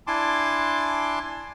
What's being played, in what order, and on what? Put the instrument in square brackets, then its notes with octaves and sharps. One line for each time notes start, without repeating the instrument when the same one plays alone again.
[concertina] D4 E4 G#5 A5 C6 D6